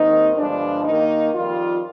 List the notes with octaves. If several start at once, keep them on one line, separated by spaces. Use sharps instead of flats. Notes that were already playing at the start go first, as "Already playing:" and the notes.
Already playing: D#2 D#3 G#3 C4 D#4
G1 G2 F3 G#3 D4
D#2 D#3 A#3 D#4
F2 D#3 G3 F4